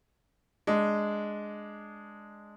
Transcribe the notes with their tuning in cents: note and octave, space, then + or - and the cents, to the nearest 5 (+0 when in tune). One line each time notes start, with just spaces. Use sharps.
G#3 +0 D4 +0